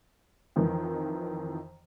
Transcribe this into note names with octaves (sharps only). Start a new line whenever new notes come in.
F2 D#3 E3